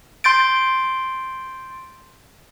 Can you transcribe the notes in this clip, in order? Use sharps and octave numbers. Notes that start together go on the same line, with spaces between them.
C6 G6 A6 D7